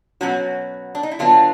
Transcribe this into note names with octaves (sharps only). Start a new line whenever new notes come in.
B2 F#3 A#3 C#4 F#4
D4
D#4
E4
D3 F#3 B3 D4 F4